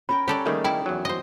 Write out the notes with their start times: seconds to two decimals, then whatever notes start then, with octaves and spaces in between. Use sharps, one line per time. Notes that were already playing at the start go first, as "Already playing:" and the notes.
0.09 C#4 A#4 G5 B5
0.28 C#4 G4 A4 D5 F#5 A#5
0.46 D#3 G3 A3 A#3 D#4 G#4
0.64 E4 D5 G5
0.86 E2 F#3
1.05 C5 D#5